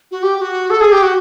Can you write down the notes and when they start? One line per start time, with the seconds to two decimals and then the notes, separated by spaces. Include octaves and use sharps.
0.11 F#4
0.23 G4
0.36 G4
0.41 F#4
0.70 A4
0.81 G#4
0.92 G4
1.03 F#4